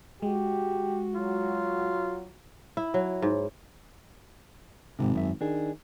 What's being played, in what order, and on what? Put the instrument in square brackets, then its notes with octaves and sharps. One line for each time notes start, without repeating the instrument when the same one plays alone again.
[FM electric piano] G#3 [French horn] F#4 [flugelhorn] G4
[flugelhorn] F#3 [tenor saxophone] F4
[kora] E4
F#3
G#2
[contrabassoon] G#1 [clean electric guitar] G#2 C3
[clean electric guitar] F#2 E5
[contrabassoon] D#3 [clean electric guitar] D4 G#4